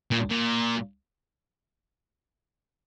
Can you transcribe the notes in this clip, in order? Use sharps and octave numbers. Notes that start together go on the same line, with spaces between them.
A#2
A#2